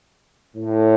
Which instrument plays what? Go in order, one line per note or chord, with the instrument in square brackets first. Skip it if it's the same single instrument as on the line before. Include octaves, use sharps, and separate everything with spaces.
[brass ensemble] A2